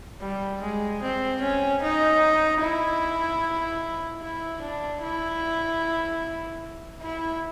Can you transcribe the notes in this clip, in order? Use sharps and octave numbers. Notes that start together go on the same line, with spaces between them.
G3
G#3
C4
C#4
D#4
E4
E4
D4
E4
E4